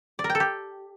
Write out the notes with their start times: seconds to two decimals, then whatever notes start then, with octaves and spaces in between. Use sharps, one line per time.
0.19 D5
0.24 A#4
0.30 G5
0.35 A4
0.40 G4